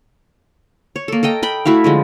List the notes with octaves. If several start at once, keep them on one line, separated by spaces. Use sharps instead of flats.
C#5
A#3 A4
A4 A#4 D#5 G5
G5 B5
A3 E4 F#4 F5
D3 F3 G#3